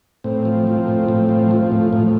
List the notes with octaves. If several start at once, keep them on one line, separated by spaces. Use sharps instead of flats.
A2 C4
F3
F3
A2
A2
F3
F3
A2
A2